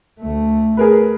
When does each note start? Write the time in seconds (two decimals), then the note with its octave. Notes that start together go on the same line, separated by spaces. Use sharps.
0.20 D2 A3
0.77 G#4 A#4 B4